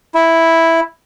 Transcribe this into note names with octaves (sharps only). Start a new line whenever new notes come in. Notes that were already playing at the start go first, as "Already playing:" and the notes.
E4